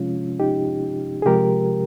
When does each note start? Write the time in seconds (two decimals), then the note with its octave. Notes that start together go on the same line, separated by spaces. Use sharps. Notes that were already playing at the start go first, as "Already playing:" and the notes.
Already playing: C3 F3 G#3 C#4 F4
0.40 D#4 G4
1.22 G#4
1.26 C3 F3 G#3 G4 A#4